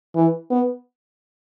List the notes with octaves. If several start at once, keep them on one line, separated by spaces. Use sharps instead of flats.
E3
B3